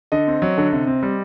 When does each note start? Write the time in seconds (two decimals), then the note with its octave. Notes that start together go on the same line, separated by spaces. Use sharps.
0.12 D3 D#5
0.27 C4
0.42 F#3
0.58 D3
0.73 C3
0.87 C4
1.03 G3